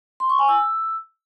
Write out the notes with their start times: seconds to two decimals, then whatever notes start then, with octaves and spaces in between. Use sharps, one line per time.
0.20 C6
0.30 C#6
0.39 G#5
0.48 E6